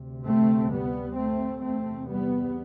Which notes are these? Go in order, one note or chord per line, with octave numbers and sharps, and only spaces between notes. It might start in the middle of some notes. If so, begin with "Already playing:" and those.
Already playing: D2 C3
A3 C4
G3 B3
A3 C4
E2 C3 A3 C4
G3 B3